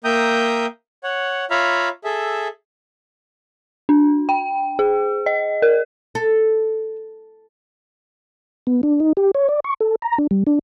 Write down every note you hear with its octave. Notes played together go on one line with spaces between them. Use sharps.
A#3 E5 G5 A#5 D#6 G6
C#5 F#5
F4 C#5 E5 F5 A#5 B5
G#4 A4 E5
D4
G5
G#4
D#5
A#4
A4
B3
D4
D#4
G4
C#5
D5
C#6
A4
A#5
D4
G3
D4